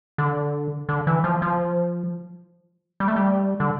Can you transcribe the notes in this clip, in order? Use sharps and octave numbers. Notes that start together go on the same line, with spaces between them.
D3
D3
E3
F3
F3
G3
A3
G3
D3